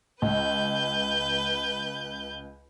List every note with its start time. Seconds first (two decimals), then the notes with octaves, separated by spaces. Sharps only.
0.22 C#2 B4 G6